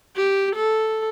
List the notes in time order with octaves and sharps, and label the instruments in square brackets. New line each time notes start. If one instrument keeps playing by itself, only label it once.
[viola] G4
A4